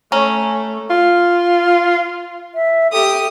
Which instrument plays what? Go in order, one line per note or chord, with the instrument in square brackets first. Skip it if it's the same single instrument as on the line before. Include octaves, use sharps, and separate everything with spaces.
[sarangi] A3 [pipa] C#4 [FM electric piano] C#5 A#5
[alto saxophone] F4
[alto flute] E5
[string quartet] G4 D#6 [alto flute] A4